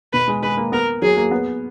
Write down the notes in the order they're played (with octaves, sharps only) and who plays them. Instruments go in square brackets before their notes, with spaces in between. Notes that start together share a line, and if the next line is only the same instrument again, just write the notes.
[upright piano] B2 [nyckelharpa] B4
[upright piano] G#3
[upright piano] G#3 [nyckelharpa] B4
[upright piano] A#3
[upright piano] B3 [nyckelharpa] A#4
[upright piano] F#3 [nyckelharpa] G#4
[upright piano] A#3
B3